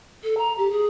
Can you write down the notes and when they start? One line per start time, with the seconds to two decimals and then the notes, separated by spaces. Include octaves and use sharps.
0.24 A4
0.38 A#5
0.58 G4
0.71 G#4